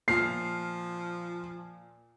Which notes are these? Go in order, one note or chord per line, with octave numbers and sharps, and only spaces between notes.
A#2 F3 F6 C7